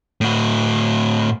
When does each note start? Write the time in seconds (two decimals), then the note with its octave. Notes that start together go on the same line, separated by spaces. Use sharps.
0.21 A2 F#4